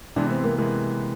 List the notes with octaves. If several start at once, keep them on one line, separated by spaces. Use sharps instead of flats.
C3 E3 G#3 B3 D4
C4
A#3
C3 E3 G#3 A#3 B3